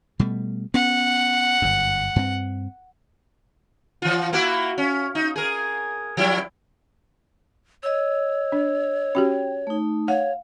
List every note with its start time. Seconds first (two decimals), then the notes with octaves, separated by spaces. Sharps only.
0.19 B2 G3 A3
0.74 B3 C#4 F#5
1.62 G1 F#2
2.16 G2 C4
4.02 E3 F4
4.33 A#3 E4 F#4
4.78 C#4
5.15 D#4
5.36 G#4 A#4
6.17 F3 G3 E4
7.83 C#5 D#5 E6
8.52 D4
9.15 C#4 F#4 G4 G5
9.67 A3 D#4
10.08 C#5 F5 F#5